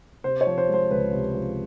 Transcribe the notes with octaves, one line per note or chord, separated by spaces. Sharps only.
C3 C5
C#5
F3
C5
G#3 C5
C#2 B4
C3
F3